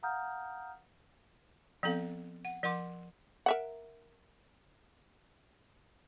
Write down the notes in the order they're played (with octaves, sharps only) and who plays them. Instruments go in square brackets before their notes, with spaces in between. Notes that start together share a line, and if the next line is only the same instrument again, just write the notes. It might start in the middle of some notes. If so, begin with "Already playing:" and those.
[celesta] F5 F#5 A#5 D#6 F6 G6
[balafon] F3 B3 C4 A4 F5
F#5
F3 A#4 F#5 C6 D6
[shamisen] A#4 E5 F#5